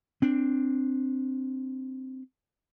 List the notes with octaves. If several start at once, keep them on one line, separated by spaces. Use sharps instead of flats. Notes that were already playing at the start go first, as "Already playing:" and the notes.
C4 D4